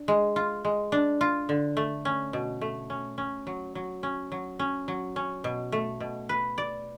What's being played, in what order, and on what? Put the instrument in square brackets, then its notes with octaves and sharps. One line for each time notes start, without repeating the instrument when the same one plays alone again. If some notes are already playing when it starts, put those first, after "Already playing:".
Already playing: [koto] D4
G#3
F4
G#3
D4
F4
D3
A3
C#4
B2
A3
C#4
C#4
F#3
F#3
C#4
F#3
C#4
F#3
C#4
B2
A3
B2
B4
D5